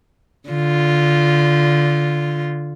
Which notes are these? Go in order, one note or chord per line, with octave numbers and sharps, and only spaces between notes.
D3 F4